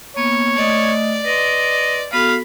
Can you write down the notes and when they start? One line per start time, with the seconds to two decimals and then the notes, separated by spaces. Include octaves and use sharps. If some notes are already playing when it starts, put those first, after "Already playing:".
0.16 A#3 B3 C#5
0.56 A3 D5 D#5 D#6
1.24 B4 D#5 C6
2.13 B3 F#4 A4 F5 B5